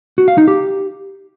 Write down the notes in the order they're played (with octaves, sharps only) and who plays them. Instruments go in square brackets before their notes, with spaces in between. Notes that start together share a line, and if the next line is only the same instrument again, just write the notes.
[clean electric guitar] F#4
F5
D#4
G4